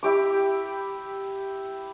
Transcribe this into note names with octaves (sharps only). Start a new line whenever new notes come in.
E4 G4 D6